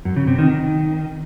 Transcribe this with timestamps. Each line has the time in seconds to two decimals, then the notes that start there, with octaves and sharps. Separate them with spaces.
0.05 F#2
0.16 C#3
0.27 C3
0.39 D#3
0.50 D#3